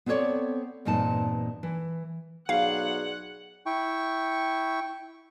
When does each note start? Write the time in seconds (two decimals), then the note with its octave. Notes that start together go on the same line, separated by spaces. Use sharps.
0.06 B3 C4 A4 A#4 C#5 D5
0.85 E2 G2 A#2 C4 D#4 A5
1.63 E3
2.49 B1 G#4 D5 F5 F#5
3.66 E4 G5 C#6